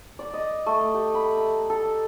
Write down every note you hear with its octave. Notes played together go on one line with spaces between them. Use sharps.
D5
D#5
A3
G4
B5
A#5
A4